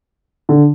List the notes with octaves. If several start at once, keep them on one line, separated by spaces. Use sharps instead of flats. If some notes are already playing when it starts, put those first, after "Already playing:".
D3